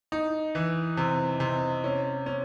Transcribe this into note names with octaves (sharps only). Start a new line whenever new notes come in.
D#4
E3
C3
C3
C#4
C#4